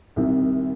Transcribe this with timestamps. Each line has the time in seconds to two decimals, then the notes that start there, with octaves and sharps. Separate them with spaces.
0.16 C2 C3 D#3